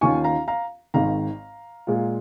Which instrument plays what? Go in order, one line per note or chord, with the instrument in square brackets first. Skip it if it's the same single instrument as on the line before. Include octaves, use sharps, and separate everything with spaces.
[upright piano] D#2 D#3 C#4 F4 G#5 C#6
F5 A#5
F5 A#5
G#1 G#2 D#3 F5 A#5
A#2 G#3 F4